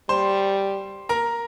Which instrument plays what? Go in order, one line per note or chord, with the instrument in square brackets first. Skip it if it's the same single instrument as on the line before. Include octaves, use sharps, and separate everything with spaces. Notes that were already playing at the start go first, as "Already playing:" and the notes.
[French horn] G3 [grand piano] C5 C6
[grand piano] A#4 A#5